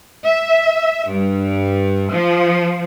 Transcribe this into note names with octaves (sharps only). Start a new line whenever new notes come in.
E5
G2
F3